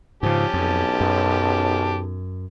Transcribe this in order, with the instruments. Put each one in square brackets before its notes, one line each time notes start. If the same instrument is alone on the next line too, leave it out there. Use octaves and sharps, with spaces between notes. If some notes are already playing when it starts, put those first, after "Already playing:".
[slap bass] G#2 C#3 [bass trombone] F3 [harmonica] C#4 G4 A5
[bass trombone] B1 [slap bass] F2
[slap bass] F#2